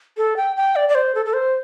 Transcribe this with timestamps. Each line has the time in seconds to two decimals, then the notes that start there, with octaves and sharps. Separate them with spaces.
0.17 A4
0.37 G5
0.56 G5
0.76 D5
0.89 D5
0.95 C5
1.15 A4
1.26 A4
1.33 C5